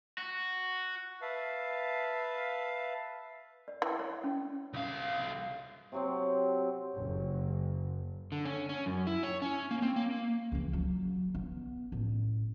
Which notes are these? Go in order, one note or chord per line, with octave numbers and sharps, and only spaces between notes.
F#4
B4 E5 F5 A5
D5
E3
C#5
C#4
C2 F5
C3 F#3 C4
F#1
D3
C#4
C#4
F#2
E4
C#5
C#4
A#3
C4
A#3
C#2 E3
F#3
B3
A1